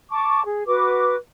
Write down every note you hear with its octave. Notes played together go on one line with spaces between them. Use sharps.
A5 C#6 D6
G#4
F#4 B4 D6